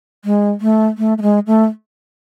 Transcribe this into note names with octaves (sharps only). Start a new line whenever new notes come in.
G#3
A3
A3
A3
G#3
A3